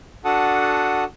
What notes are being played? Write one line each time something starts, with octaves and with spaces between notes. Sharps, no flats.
D4 F#4 A4 F#5 A5 D#6